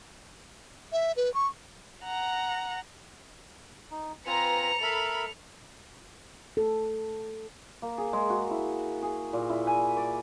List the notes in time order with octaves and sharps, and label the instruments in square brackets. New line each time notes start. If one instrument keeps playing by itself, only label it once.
[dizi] E5
B4
C#6
[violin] F#5 A#5
[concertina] D#4
[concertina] C4 F4 G#5 [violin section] B4 A#5 [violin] C#7 F7
[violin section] A4 B5 [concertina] A#4 E5
[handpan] A4
[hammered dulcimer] A#3
G#4
G#3
F#4
E4
G#4
A#2
E4
G#5
D5